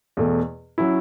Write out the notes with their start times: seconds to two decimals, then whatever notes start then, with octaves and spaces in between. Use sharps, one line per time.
0.17 E2 B2 A3
0.78 F#3 C#4 E4